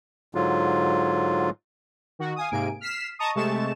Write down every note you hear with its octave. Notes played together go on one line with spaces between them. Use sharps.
G#2 D3 F#3 F4
D#3 F#4
F5 G#5 D#6
G#2 C3 A#3 G#5 D7
F6 B6 C7 E7
D#5 A5 A#5 C#6 D#6
C3 G#3 A3 A5 C#6 E7